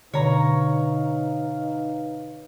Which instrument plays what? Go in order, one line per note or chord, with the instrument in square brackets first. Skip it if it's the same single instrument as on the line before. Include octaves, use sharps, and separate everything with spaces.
[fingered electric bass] B2 D3 [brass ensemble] D#4 B4 F5 [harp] C#5 A#5